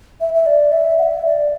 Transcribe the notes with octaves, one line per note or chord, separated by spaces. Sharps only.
E5
E5
D5
E5
F#5
E5
D5